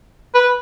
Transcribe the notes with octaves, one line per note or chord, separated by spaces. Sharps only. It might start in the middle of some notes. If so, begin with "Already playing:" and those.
B4